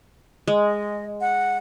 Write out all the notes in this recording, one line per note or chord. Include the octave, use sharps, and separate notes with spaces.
G#3
D#5
F#5